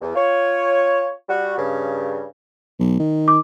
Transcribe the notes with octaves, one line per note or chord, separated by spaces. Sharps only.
E2
F4 C#5
G3 F#4
G2 C#3
B1
D#3
D6